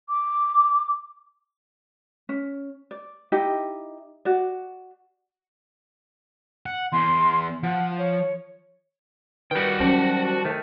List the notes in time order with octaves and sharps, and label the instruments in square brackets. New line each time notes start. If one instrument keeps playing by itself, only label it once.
[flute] D6
[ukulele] C#4
D5
D#4 E4 G4 D#5
F#4 D5
[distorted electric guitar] F#5
[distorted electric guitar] E2 [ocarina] C6
[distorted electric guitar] F3 [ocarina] F#5
[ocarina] C#5
[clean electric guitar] D#3 G3 [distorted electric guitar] F#4 G5 [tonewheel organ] B4
[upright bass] F#3 C#4 [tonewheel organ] C5 A5
[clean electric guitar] D#3 A3